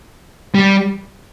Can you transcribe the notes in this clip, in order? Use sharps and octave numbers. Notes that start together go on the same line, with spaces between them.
G3